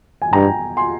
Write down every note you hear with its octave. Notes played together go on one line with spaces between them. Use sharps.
G#5
G2 G5 A#5
G#5 C6